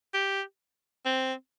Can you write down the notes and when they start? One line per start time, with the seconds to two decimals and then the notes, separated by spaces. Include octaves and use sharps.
0.14 G4
1.06 C4